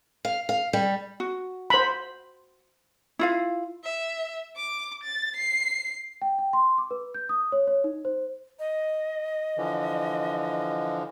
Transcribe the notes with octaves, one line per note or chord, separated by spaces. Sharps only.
F5
F5
G3
F#4
C5 B5
E4 F4 F5
E5
D6
A6
C7
G5
G5
C6
D6
B4
G6
D#6
C#5
C#5
D#4
C5
D#5
D3 E3 F3